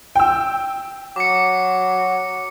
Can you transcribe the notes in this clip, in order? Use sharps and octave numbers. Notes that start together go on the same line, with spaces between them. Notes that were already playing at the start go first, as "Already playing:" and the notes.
G5 E6
F#3 D6 C#7